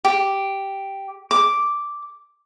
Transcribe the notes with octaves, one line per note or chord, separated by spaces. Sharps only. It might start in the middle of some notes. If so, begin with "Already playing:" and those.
G4
D6